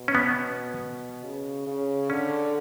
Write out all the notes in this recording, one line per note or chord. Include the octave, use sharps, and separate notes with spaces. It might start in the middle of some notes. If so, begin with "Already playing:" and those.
Already playing: B2
C#4
B3
C#3
C#3
D3 C#4